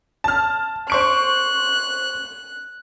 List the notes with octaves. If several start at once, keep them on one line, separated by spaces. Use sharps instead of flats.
A5 F6
C5 C#6 F#6 D7